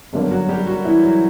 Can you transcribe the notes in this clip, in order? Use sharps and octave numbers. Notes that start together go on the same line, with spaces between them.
G1 F#2 D3 A#3
F#3 F#4
G3 G4
F#3 F#4
E3 E4
F#3 F#4